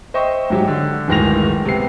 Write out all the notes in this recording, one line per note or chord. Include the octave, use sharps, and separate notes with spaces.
C5 D#5 E5 G5 C#6
G#2 F#3 G4
D3
D1 G1 D#3 G#3 A#6 F7
C3 B3 C7